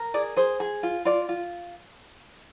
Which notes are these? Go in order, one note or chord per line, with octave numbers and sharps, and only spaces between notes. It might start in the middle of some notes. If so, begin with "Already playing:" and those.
Already playing: A#4
G#4 D5
G#4 C5
G#4
F4
F4 D5
F4